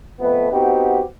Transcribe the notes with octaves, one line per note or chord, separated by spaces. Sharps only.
F2 A3 B3 B4
B3 C4 D#4 F#4 G4